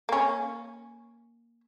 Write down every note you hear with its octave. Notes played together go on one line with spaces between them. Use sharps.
A#3 C#4